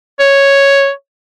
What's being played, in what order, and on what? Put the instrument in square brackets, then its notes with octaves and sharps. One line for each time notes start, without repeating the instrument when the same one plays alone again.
[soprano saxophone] C#5